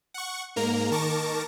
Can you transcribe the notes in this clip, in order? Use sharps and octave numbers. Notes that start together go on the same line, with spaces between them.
F#5 C#6
G#2 A#3 A#4 A#5
D#3 A#4 A5 C#6 D6 A#6